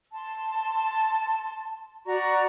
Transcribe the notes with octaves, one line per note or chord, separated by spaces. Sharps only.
A5 C6
F#4 D5 A#5 C#6